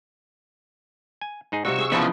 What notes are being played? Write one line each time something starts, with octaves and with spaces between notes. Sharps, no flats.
G#5
G#2 D#4 G#4
C3 G3 D#4 F4 F#4 C#6 E6
G#4
C#3 E3 F3 B3 D#4 E4 G5